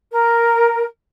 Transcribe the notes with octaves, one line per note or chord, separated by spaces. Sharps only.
A#4